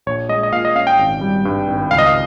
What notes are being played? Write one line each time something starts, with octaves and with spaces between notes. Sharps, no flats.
A#1 C#5
G#3 D#5
D#5
A#2 F5
D#5
C#4 F5
G5
G#1
G3
G2
G#1
C#2 F5
D#5
F5